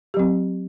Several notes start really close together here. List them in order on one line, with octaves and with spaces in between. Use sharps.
G4 F#3 C4